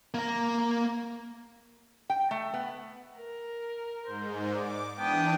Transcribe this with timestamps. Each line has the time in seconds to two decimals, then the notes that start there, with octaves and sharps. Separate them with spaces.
0.14 A#3 A#5
2.10 G5
2.31 A3
2.54 B3
3.19 A#4
4.06 G#2 C5
4.55 D5 D6
4.99 E3 B3 D4 G5 A5 D#6